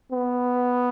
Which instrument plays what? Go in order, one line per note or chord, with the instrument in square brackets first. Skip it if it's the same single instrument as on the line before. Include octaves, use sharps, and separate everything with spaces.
[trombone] B3